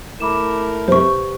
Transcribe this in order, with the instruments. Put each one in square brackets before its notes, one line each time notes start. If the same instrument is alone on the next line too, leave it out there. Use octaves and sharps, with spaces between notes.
[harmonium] A3 E4 A#4 [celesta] B5 D6 E7
[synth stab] F#2 C3 [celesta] G4 B4 [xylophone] C5 C#6